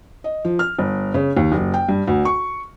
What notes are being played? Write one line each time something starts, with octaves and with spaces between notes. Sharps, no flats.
D#5
F3
F6
G1
C#3
D#2
F#1
G5
G2
D2
C#6